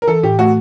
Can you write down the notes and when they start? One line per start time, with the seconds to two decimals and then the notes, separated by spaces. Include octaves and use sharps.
0.02 A#4
0.07 E3 A4
0.23 A2 G4
0.39 A3 F#4